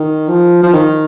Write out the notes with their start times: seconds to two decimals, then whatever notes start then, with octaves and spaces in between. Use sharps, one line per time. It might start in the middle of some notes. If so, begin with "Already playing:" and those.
Already playing: D#3
0.28 F3
0.63 F3
0.73 D#3